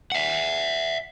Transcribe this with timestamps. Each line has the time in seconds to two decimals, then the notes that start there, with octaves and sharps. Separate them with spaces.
0.12 E5 F#5